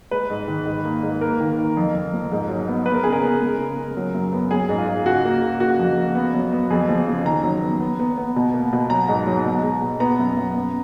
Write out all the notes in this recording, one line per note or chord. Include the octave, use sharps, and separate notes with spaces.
G#3 B4
G#2
D#3
G#2
A#3
G#2
A#3 A#4
D#3
A#3
F2
F2
F3
G#2
F#3
B3
B3 B4
A#4
C#3 G#4
A#4
B3
G#3
C#3
G#3
F#3
F#2
B3
F#3 G#4
G#2
F4
G#2
C#3 F#4
A#3
C#3
A#3 F#4
F2
A#3
B3
F#3
B3
F2 G#4
F3
C#3
D#3 A#5
F#3
B3
B3
B3
B3
B2
A#3
B2
F#3 A#5
G#2
F#3
B2
G#3
B2
B3 A#5
F#2
F#2
B3